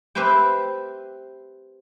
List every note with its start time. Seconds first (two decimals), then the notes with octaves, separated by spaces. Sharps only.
0.15 C4 G4 B4 C5 E5 G5